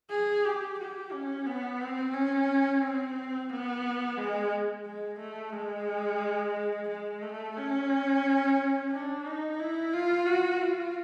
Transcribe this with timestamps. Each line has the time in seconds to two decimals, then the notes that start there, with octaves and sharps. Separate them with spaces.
0.10 G#4
0.45 G4
0.79 G4
1.12 C#4
1.46 B3
1.80 C4
2.14 C#4
2.81 C4
3.49 B3
4.17 G#3
4.85 G#3
5.19 A3
5.53 G#3
6.88 G#3
7.22 A3
7.56 C#4
8.92 D4
9.25 D#4
9.60 E4
9.93 F4
10.27 F#4
10.62 F4